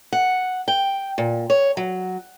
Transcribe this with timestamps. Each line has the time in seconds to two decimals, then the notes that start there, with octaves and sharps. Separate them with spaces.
0.13 F#5
0.68 G5
1.18 A#2
1.50 C#5
1.77 F#3